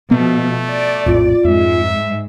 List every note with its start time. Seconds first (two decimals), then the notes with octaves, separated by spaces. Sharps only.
0.11 B2 F3 A3 B3
0.67 D5
1.06 A#1 F2 A2 F4
1.44 F2 G#2 G#3 E5